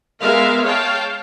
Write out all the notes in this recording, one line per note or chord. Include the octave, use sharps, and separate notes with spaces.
G#3 B3 A#4 E5 F5
C#5 F5 G5 A5